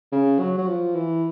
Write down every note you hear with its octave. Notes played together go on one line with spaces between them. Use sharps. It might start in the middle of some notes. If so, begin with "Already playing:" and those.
C#3
F#3
F#3
F3
E3